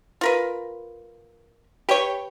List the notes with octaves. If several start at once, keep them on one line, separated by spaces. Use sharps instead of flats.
F4 A#4 B4
G4 B4 C#5 G5